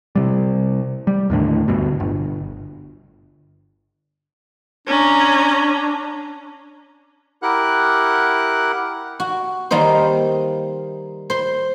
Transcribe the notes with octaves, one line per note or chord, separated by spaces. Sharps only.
C3 G3
G3
D#2 A2 D3
D2 G2 B2
G1
C#4 D4 A#5
E4 G4 A#4 F#5 F#6
F#4
D#3 G3 A#3 D#4 C5
C5 C6